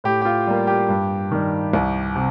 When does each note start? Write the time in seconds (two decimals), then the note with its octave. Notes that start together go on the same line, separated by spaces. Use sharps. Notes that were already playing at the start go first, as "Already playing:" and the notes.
0.04 A2 G4
0.22 G4
0.25 F4
0.47 G3 A#3
0.67 G4
0.89 G2
1.31 D#3 G3
1.73 C2
2.16 C3